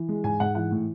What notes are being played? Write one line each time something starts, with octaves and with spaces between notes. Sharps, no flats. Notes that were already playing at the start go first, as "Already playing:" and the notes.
Already playing: E3
G#3
G#2 G#5
G#2 F#5
E3 F#5
A2